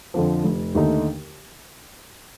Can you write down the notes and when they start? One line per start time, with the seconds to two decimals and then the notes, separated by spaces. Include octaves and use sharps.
0.14 F2 D3 F3
0.44 F1
0.75 D#2 D3 A3 D#4